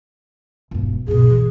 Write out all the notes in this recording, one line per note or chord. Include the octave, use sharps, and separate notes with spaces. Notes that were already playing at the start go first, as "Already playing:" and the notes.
E1 G2
G2 B2 G#4
E3 G3